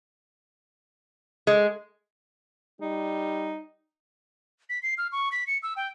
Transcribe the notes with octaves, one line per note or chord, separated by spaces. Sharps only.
G#3
G3 D#4
B6
C7
F6
C#6
B6
C#7
E6
G5